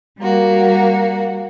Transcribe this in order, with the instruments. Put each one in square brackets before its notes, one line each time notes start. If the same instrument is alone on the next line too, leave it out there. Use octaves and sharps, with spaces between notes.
[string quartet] G3 A#3 F#4